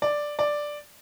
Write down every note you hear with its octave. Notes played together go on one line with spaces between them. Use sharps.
D5
D5